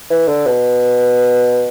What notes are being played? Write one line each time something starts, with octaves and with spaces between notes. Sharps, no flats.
E3
D3
B2